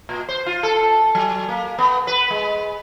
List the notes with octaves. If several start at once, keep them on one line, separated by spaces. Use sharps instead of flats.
A#2
C5
F4
A4
F#3
A#3
B3
B4
G#3